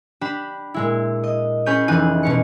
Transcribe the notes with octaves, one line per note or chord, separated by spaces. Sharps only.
D4 G4 B5 E7
A#2 G#3 E4
D#5
C#4 G#4 C#5 B5 G6 D#7
F1 E3 D#4 G#4 F#6 D#7
B2 C#4 C#7